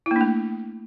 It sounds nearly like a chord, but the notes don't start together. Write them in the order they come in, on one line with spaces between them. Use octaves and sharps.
E4 A#3 D4 A3